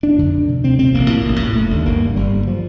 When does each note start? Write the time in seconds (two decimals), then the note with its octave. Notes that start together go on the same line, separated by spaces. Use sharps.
0.03 F1 D4
0.19 F2 D3
0.34 D2
0.48 C3
0.64 D2 C4
0.79 C3 C4
0.94 A1 A#3
1.10 A2
1.25 A1
1.40 A2
1.55 F1 A3
1.71 D#2 D3
1.85 G1 A#3
2.01 G2 D3
2.16 G1 G3
2.31 G2 D3
2.47 F3